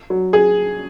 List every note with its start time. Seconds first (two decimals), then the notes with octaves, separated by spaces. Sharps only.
0.10 F#3
0.33 G#4